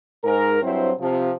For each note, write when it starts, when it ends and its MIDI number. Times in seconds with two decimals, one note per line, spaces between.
0.24 0.59 44
0.24 0.59 70
0.62 0.92 43
0.62 0.92 54
0.62 0.92 60
0.62 0.92 64
0.62 0.92 72
1.00 1.31 48
1.00 1.31 53